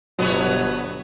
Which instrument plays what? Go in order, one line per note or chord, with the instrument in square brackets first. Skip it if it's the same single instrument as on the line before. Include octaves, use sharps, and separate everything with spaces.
[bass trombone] G1 [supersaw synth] B2 F#3 [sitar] B3 B4 C#5